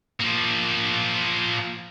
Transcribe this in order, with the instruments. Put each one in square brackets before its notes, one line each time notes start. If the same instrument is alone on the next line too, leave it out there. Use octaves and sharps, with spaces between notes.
[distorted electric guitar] F3 A#3